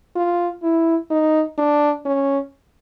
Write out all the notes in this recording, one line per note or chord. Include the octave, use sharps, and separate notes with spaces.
F4
E4
D#4
D4
C#4